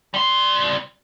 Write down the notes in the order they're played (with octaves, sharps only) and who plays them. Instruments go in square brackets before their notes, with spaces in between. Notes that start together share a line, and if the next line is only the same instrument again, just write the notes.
[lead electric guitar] G3 C6